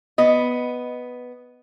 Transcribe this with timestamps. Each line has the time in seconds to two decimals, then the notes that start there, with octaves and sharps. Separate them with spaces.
0.18 B3 D#5